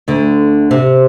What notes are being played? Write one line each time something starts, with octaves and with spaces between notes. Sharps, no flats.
D2 D3
C3